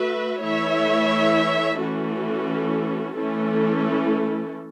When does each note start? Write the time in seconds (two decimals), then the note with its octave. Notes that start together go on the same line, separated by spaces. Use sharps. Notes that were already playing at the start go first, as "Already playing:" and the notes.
Already playing: A3 F#4 B4 E5
0.40 E3 A3 E4 C#5 E5
1.78 E3 A3 C#4 F#4 A4
3.16 E3 A3 C#4 E4 A4